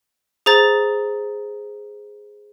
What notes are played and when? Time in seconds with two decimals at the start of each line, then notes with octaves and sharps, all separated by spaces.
0.46 G#4 C5 A#5 A6